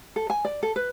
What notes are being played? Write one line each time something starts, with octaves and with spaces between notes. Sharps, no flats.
A4
G#5
D5
A4
B4